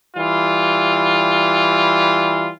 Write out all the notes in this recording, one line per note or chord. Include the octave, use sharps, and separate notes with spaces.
E3 G3 F4